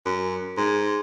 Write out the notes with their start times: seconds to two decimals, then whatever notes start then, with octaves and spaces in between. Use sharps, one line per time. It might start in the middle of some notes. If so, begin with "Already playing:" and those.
0.05 F#2
0.57 G#2